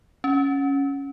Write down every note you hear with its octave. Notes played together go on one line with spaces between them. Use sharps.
C#4